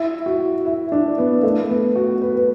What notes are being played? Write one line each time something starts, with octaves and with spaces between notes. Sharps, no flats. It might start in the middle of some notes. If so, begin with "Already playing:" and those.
Already playing: E4
F#4
E4
D4
B3
A3
B3
F#4
B4
B4